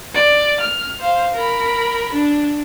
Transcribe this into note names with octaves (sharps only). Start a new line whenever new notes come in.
D5
F6
C5 F5
A#4 B5
D4